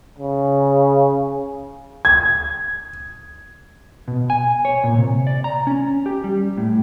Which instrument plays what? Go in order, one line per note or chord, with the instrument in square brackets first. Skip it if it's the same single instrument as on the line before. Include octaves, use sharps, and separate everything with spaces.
[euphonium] C#3
[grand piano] G#6
[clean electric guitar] B2
G#5
C#5
A#2
C3
D5
A#5
C#4
G4
G3
A2